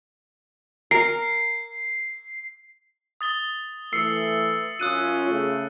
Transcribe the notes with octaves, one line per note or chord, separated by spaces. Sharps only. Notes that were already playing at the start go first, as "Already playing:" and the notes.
A#4 C7
D#6 A6 G7
E3 A3 E6 C7 C#7
F#2 C#4 F4 D#6 F#6 D#7
C#3 A3